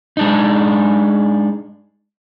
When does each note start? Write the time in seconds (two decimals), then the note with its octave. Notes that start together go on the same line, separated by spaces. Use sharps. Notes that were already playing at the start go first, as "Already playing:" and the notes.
0.17 G#3 D4 D#4